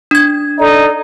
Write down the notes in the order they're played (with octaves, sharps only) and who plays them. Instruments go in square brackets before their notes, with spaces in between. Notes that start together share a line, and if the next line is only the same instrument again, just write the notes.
[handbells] D4 G#6
[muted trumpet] D#4 [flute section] A4 D5